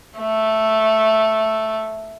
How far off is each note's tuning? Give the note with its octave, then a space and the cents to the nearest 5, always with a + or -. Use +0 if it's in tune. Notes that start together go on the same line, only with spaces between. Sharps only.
A3 +0